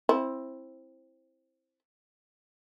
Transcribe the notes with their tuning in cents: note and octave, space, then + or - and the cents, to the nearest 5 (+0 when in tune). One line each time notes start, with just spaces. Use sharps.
C4 +15 E4 +0